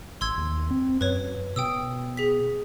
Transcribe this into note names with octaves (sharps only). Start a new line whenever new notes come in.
A1 C6 E6 G#6
D#2
C4
F#2 B4 C#5
B2 G5 D#6 E6
G#4 B6